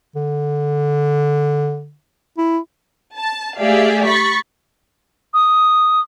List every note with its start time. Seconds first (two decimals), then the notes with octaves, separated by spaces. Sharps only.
0.15 D3
2.38 E4
3.15 A5
3.59 A3 G4 G#4 D5 E5 F5
4.07 B5 C#6 A6 B6
5.34 D#6